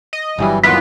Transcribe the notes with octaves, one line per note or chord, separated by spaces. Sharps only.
D#5
G1 G2 E3 F#3 G3
D#2 D#3 E3 B3 F4 B4 B6